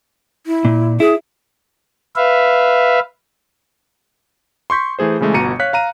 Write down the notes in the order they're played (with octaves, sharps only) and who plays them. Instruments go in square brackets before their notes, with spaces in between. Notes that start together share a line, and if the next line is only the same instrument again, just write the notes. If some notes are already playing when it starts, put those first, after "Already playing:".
[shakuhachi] E4
[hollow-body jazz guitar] A#2
[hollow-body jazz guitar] E4 [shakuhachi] G#4
[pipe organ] B4 E5 F5
[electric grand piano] C6 C#6 G6 B6
E3 A3 G#4 C5
C#3 E3 G#3 A3
G1 B2 A#5 C#7 D#7
C#5 F5 F#6 B6
F5 A#5 D#7